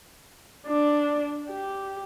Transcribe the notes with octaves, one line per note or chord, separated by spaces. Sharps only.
D4
G4